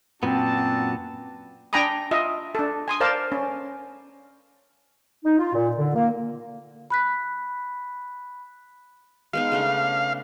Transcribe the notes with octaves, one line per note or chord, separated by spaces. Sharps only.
F#2 A#2 B3 C4 D4 F#4 A5
D4 G5 G#5 A#5 B5 D#6
F4 D#5 E5
D4 A4
G#5 C6 D#6
A#4 C5 D5 F5 A5
C#4
D#4
F4
A#2
D3
A#3
B5 F#6 B6
G#3 B3 D#4 F5
C#3 A3 D4